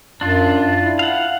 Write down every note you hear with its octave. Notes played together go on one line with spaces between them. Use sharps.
F#2 D4 F4
E4
F5 F#5